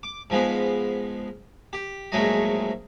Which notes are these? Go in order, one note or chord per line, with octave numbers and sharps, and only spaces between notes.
D6
G#2 F3 G#3 B3
G4
A#1 G#2 F#3 G#3 A3 D#5